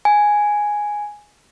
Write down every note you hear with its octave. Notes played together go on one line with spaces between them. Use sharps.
G#5